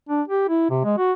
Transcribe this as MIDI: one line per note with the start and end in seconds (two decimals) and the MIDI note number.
0.09 0.22 62
0.28 0.46 67
0.49 0.69 64
0.70 0.80 48
0.84 0.96 56
0.98 1.13 66